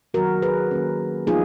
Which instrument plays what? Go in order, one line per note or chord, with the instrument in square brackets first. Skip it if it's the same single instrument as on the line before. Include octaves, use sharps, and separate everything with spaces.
[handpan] D#3 F#3 B3 F#4 A#4
G#4 B4
D#3 A#3 C#4
F3 G#3 B3 D#4 F4 G#4